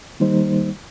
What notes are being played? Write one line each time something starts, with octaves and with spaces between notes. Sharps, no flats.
D#3 G3 A#3 D#4 C5